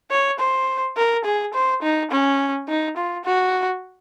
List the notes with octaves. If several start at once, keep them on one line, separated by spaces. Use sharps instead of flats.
C#5
C5
A#4
G#4
C5
D#4
C#4
D#4
F4
F#4